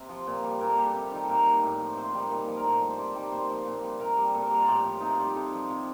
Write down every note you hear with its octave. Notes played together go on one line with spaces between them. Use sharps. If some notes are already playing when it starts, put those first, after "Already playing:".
Already playing: C3 G4
F3
A#2
G3
A#2 A#4
A4
G3 G4
A4
C3
D#3 G3
A#2 A4 A#4
G3
A2
F3
C3 C5
D#3 G3
A#2
F3
A#4
A2 A4
G3 A4
C5
C3 D5
D#3 G3
A#2 C5
F3
A#2
G3
C3 A#4
G3
A#2 A4
A#4
G3 G4
F4
A2 G4
F3
C3 D#4
F4
G3 G4
C3 A4
F3
C3